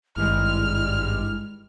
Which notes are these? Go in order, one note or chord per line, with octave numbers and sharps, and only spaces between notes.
G#1 G2 G3 G#3 E4 F6